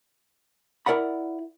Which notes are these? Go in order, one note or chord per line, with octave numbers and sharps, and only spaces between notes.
E4 A#4 D5 F#5 B5